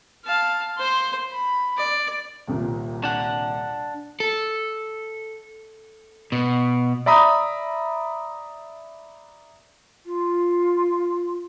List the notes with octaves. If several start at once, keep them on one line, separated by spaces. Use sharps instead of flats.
F5 A5
C5 C6
B5
D5
D#1 C2 A#2
D4 F#5
A4
B2
D5 E5 A#5 B5 D#6
F4